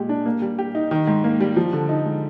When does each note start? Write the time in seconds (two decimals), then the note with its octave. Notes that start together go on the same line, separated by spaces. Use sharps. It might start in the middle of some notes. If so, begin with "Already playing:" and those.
Already playing: A#2 G#3 G4
0.09 D4
0.26 A#3
0.42 G3
0.59 G4
0.75 D#4
0.91 D#3
1.07 G#2
1.24 A#3
1.40 G3
1.56 F3
1.73 D3
1.89 D#4
2.05 G#3